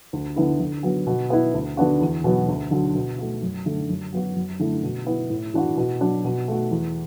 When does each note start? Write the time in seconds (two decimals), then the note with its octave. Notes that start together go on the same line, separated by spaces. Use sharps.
0.13 D2
0.36 D3 B3 E4
0.60 D3
0.83 F#3 B3
1.07 B2
1.30 B3 E4
1.54 D2
1.77 D3 B3 D4 F#4
2.01 E2
2.24 B2 F#3 B3
2.48 D2
2.71 D3 F#3
2.95 B2
3.18 A3 F#4
3.42 F#2
3.65 D3 A3
3.89 F#2
4.13 F#3 B3 F#4
4.36 F#2
4.60 D3 A3 E4
4.83 B2
5.07 B3 E4
5.30 A2
5.54 E3 D4 F#4
5.77 B2
6.01 F#3 D4
6.24 B2
6.48 A3 F#4
6.71 E2